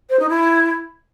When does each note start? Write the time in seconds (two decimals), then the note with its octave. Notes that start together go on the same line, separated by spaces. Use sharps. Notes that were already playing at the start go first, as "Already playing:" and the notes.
0.10 C5
0.20 D#4
0.30 E4